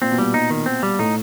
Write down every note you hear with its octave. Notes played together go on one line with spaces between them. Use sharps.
A#2 C4
B2
A#2 G3
D#4
D#3
C4
G3
A2 D#4